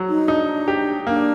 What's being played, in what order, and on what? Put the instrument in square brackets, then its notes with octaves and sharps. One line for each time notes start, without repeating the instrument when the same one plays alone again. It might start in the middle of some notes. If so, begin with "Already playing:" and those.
Already playing: [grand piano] F#3
[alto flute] D#4
[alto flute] D4 [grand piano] D#4
[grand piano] G4
[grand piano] A#3 [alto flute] D4